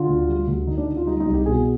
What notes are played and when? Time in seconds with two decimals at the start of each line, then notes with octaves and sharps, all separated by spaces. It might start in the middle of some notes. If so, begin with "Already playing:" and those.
Already playing: D3 F4
0.08 D2
0.28 G3
0.47 D2
0.67 D3 D#4
0.77 D4
0.87 D2 D#4
0.97 F4
1.06 G3 D#4
1.20 D#4
1.26 C2
1.34 G4
1.46 B2 G#4